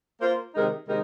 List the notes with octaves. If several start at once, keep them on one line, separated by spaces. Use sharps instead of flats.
A#3 F4 C5
C3 D#3 G#3 D#4 A#4
C3 D#3 G#3 D#4 A#4